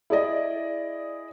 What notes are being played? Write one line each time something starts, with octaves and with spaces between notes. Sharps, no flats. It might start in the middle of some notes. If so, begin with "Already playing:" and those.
E4 G#4 D5 D#5